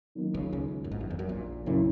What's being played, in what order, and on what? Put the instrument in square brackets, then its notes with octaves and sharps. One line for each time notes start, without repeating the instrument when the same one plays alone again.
[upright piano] D#3 F#3 A#3 D#4
[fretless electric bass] C#2 C#3
C#2 C#3
F#2
G#1 G#2
F#2
E2
F#2
A#1 A#2
[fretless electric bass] A#1 A#2 [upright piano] F#2 C#3 F#3 C#4 E4